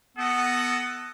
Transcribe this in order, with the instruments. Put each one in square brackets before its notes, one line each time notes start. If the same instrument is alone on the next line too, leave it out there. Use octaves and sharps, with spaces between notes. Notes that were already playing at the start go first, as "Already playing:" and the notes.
[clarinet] B3 [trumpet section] A4 D#5 F#5